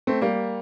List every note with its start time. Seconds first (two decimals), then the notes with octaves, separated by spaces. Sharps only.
0.07 A3 C4
0.21 G3 A#3